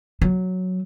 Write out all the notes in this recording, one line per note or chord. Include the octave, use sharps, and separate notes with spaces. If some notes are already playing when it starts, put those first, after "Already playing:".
F#3